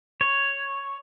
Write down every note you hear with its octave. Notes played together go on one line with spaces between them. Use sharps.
C#5